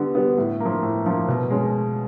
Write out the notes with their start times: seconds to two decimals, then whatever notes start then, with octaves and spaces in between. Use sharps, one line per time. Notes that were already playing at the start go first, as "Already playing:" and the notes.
Already playing: D3 G3 B3
0.15 G3 B3
0.38 A2
0.60 A#3
0.65 F3
0.83 A2
1.06 F3 A#3
1.28 B2
1.50 G#3 C#4